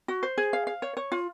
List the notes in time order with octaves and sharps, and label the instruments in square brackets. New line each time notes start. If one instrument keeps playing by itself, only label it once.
[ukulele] F#4
C5
G#4
F5
F5
C#5
C#5
F4